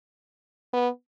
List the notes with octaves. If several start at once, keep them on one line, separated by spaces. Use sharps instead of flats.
B3